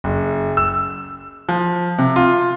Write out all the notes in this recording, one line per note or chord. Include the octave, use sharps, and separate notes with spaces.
F#1
E6
F3
C3
F4